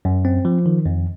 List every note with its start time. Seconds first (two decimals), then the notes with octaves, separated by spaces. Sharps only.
0.05 F#2
0.25 C4
0.45 F3
0.66 D#3
0.86 F2